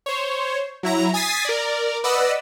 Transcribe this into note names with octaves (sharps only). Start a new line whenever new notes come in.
C5 C#5
F#3 E4 A#5
G#5 D#6 A6 B6 C7
A#4 D5
B4 D5 D#5 F#5 E6